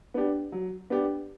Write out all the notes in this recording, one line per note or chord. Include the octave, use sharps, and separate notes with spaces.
B3 D4 G4
F#3
B3 D4 G4